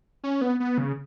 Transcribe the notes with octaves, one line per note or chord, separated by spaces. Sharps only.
C#4
B3
B3
C#3